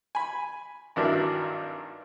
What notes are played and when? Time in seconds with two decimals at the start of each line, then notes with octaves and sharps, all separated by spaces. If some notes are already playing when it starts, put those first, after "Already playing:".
0.15 G#5 B5
0.96 G#1 G2 F#3 D4 E4 A#4